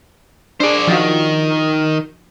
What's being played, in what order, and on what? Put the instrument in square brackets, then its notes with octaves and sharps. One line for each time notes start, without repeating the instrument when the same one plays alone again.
[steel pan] D4 G#4 [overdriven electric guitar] C5 D5
[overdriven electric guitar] D#3 [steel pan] F3 F4 F#4